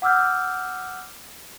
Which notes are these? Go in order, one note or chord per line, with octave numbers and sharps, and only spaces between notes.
F#5 D6 E6 F6 G6